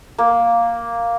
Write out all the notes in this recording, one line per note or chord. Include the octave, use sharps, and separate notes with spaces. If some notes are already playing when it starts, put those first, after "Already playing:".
A#3